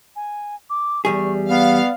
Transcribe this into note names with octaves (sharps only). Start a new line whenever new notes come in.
G#5
D6
E2 G3 G#4 C#6
B3 D5 F5